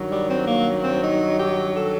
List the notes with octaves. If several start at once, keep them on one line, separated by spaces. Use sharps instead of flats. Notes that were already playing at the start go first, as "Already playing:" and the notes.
Already playing: G2 D#3 F#3
G3
C4
A#3
C4
D#4
G4
A4